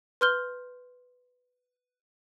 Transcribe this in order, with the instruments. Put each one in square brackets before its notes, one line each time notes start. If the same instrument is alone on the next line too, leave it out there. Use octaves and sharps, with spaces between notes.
[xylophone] B4 C6 F6 G6 G7